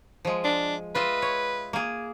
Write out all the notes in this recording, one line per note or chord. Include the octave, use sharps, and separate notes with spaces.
F3 G#3
D4
F4 B4 D#5 E5
C#5
A#3 G#4